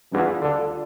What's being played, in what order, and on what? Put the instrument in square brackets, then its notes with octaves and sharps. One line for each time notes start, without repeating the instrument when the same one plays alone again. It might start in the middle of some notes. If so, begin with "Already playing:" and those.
[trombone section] E2 E3 [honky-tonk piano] G3 D4 F4
[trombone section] D2 D3